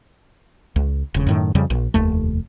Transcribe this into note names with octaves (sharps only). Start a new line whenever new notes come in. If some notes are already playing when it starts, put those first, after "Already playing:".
C#2
E1 C#3
F#2 A2 D#3
F2 C#3 G3
A#1
F1 D#2 A3